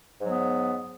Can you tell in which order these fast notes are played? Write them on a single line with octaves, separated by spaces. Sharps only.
G#2 F#3 B3